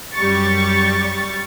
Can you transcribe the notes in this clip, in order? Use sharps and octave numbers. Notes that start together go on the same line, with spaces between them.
F#2 G3 G4 C#6 A6